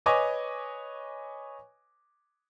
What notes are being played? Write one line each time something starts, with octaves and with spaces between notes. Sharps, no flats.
B4 C#5 D#5 G#5 C#6 D6